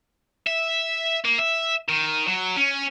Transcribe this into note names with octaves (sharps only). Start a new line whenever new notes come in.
E5
A#3
E5
D#3
F#3
C#4